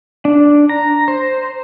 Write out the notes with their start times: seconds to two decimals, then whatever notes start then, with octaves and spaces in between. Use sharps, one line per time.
0.25 D4
0.69 A#5
1.08 C5